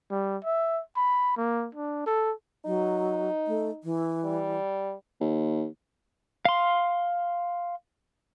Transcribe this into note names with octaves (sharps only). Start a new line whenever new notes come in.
G3
E5
B5
A#3
D4
A4
F#3 D#4
A3
E3
G3
D#2
F5 C6